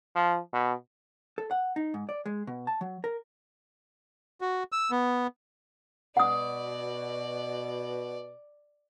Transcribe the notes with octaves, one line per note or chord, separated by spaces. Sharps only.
F3
B2
A4
F#5
D#4
G#2
D5
G#3
B2
A5
F#3
A#4
F#4
E6
B3
B2 D5 F#5 D#6